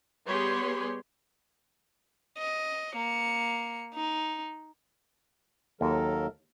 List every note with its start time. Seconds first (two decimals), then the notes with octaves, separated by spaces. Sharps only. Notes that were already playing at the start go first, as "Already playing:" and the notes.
0.25 G3 B3 G4 G#4 C#5 C6
2.38 D#5
2.96 A#3 C#7
3.95 D#4
5.81 D#2 F#3 A4 A#4